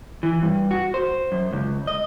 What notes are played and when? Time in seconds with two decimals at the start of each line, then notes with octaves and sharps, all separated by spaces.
0.23 E3
0.43 G2
0.71 F#4
0.94 C5
1.32 F#2
1.52 C#2
1.87 D#5